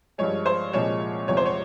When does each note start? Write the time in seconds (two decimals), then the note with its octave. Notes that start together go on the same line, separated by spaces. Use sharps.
0.18 G2 F3 G#3 C#5
0.46 C5
0.73 C2 A#2 F3 G#3 C#5
1.28 E2 C3 F3 G#3 C#5
1.37 C5
1.46 C#5